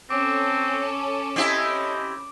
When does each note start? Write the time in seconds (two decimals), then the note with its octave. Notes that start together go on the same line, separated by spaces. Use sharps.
0.10 C4 C#4 A4 D6 D7
1.36 C4 E4 G4 D#5